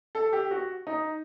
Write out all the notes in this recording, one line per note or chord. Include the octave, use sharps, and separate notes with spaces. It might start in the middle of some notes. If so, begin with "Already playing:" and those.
A4
G4
F#4
D#4